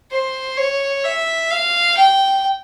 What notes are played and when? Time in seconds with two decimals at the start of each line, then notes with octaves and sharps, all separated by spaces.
0.11 C5
0.57 C#5
1.04 E5
1.51 F5
1.97 G5